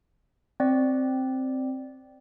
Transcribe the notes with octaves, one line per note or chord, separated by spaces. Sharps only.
C4 D5